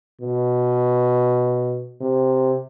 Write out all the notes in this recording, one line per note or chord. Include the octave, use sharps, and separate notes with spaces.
B2
C3